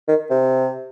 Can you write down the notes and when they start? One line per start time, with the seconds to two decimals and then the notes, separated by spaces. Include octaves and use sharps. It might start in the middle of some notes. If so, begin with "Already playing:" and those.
0.08 D#3
0.30 C3